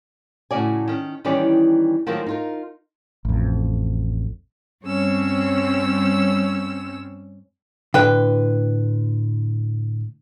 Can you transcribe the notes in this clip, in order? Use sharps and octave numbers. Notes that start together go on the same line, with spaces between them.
A2 C#3 F#4 D5 G#5
D#3 C#4
D#3 E3 G3 C#4 D#4 D5
D#3 F3 F#3 G#3 A#3
D#4 F4 A#4
A1 F2
G2 G3 C4 C#4 C#5 E6
A2 D3 B4 G5